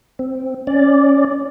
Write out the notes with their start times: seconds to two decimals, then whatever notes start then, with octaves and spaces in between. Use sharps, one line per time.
0.19 C4
0.67 C#4 D5